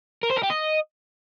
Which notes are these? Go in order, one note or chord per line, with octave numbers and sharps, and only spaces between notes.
A#4
C5
A#4
G4
D#5